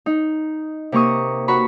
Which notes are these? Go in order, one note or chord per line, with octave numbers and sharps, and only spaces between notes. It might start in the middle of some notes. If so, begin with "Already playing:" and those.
D#4
C3 A#3 A#5 C#6 D#6
F#4 B4 A#5 B5 C#6